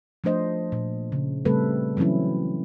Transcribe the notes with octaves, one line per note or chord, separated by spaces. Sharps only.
F3 A3 D4 C5 D#5
A#2
C#3
C#3 G3 A3 C4 A4 B4
E3 F#3 C4 C#4 E4